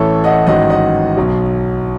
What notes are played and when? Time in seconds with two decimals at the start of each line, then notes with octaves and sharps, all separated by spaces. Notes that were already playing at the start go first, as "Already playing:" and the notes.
Already playing: A1 A2 E3 A4 C#5
0.24 D#5 F#5
0.47 A1 G#2 D#3 F#3 D#5 F#5
0.70 D#5 F#5
1.17 B1 B2 F#3